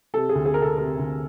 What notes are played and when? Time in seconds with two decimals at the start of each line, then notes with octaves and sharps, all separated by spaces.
0.14 C3 A4
0.29 G#4
0.35 D2
0.46 G#4
0.54 C3 A#4
0.62 A4
0.78 C3 A#4
0.99 D2